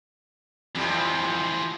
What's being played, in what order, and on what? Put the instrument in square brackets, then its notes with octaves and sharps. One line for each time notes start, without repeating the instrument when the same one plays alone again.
[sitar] F2 C3 G3 [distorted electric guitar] E3 F3